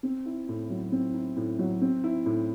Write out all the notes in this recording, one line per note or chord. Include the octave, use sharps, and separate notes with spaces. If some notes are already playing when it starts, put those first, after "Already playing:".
C4
E4
A2
F#3
C4
E4
A2
F#3
C4
E4
A2